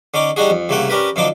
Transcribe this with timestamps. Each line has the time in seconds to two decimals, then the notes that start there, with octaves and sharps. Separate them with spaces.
0.14 D3 C#4 D#4 D6
0.36 G3 D4 D#4 F#4 G#4
0.50 F2
0.69 C2 C#3 A3 A#3 F#5 G5
0.90 C#4 D4 G4 A#4 B4
1.16 F#2 D3 F3 D#4 D6